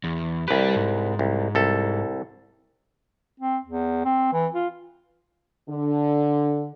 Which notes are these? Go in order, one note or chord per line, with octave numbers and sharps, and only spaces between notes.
E2
C2 G4 B4 D5
G#2
C2
C2 A4
C4
E2
C4
E3
F4
D3